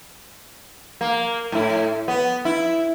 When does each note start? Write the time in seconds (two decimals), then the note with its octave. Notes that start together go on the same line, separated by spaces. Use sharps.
1.01 A#3
1.52 A2 E4
2.08 B3
2.45 E4